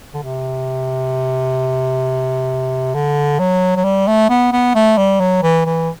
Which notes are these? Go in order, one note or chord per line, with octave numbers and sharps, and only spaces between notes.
D3
C3
D3
F#3
F#3
G3
A3
B3
B3
A3
G3
F#3
E3
E3